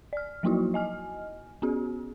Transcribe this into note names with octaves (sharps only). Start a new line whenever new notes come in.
D5 F6
F3 F#3 A#3 D#4 E4 F#4
D#5 G#5 F6
B3 C#4 F#4 G#4